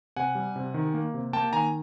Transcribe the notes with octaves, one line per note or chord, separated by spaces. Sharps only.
C3 F#5 G#5
G3
C3
D#3
A#3
C3
A#3 G5 A5
D#3 G#5 A#5